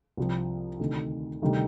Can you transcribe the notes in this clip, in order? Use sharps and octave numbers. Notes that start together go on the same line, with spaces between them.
C2 C3 F3 C4
D2 C3 D#3
D2 C3 D#3 G3 C4